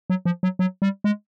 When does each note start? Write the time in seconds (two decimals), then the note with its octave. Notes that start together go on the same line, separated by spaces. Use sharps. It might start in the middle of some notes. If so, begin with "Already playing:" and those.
0.10 F#3
0.25 F3
0.43 F#3
0.59 F#3
0.82 G3
1.04 G#3